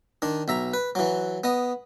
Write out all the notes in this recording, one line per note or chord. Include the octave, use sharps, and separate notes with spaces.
D#3 D4
B1 E5 A#5
B4
E3 F#3
B3 D#5